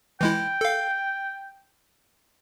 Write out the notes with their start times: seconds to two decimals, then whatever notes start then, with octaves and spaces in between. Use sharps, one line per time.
0.21 E3 G#3 E4 G5
0.61 A4 F5